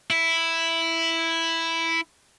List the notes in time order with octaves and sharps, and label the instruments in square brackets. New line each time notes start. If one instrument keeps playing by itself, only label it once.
[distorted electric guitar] E4